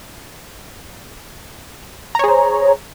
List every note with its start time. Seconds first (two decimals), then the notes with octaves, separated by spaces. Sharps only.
2.15 A#5
2.19 C#5
2.24 G#4
2.28 C5